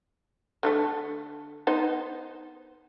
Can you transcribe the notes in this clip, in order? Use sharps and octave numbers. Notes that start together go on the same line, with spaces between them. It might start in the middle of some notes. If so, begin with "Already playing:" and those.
D3 G3 A3
B3 D#4 C5